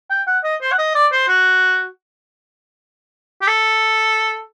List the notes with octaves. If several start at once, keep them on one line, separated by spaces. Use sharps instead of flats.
G5
F#5
D#5
C5
F#5
D#5
D5
C5
F#4
G4
A4